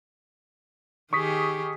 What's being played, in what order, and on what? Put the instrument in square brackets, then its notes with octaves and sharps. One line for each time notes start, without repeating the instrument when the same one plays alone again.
[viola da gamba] D#3 G4 G#4 [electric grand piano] C#6 D#6 B6